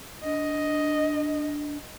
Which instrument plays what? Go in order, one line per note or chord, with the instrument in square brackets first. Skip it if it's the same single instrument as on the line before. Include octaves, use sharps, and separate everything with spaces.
[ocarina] D4 [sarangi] D#5